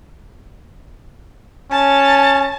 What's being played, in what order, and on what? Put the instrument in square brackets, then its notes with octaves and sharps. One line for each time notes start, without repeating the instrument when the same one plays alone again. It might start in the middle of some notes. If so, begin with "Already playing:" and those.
[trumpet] C#4 [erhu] A5